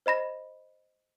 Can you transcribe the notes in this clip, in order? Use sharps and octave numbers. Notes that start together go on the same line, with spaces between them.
C5 D#5 B5 A#6